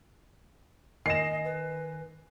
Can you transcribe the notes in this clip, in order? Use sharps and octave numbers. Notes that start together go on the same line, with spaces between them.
D#3 D#5 G#5 A#6 C7 E7
B4